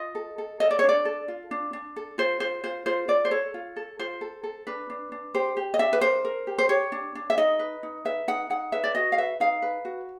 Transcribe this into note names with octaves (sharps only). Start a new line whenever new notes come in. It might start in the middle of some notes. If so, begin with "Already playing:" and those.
Already playing: F4 D#5
A4
A4
A4 D#5
D5
C#5
D4 D5
A4
F4
D4
D4
A4
F4 C5
F4 C5
F4 C5
F4 C5
F4 D5
C5
A4 C#5
F4
A4
F4 C5
A4
A4
D4 B4
D4
D4
G4 C5
G4
D#5
D4 E5
B4
A#4 C5
A#4
G4
C5
G4 C#5
D4
D4
E5
D#4 D#5
B4
D#4
B4 E5
D#4 F#5
D#4 F#5
B4 E5
D5
F#4 D#5
F5
B4 E5
D#4 F5
B4
F#4